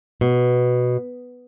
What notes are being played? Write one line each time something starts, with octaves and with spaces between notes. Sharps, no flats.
B2